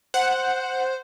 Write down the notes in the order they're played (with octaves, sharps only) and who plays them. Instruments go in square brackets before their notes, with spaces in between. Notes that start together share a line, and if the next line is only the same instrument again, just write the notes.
[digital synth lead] C5 [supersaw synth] F#5